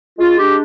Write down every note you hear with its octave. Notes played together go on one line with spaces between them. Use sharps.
G#3 F4
D4 G4